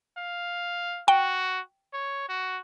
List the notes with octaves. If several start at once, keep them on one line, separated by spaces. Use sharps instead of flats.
F5
F#4 G5
C#5
F#4